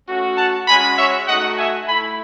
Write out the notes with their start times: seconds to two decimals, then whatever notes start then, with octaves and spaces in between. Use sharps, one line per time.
0.08 A3 C#4 F#4
0.38 F#5 A5
0.68 G#3 C#4 F#4 G#5 B5
0.98 C#5 E5
1.28 A3 D#4 F#4 D#5 F#5
1.58 E5 G#5
1.88 A3 E4 G#5 B5